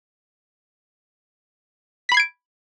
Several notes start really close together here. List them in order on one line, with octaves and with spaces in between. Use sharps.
B6 B5 C7 G#6 D7